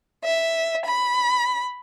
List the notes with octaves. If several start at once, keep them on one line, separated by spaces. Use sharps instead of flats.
E5
B5